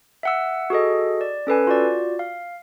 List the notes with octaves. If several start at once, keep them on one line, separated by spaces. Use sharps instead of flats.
E5 F#5 E6
F#4 G#4 A4 D#5
D5
C#4 A4 B4 G#5
F4 F#4 D5
F5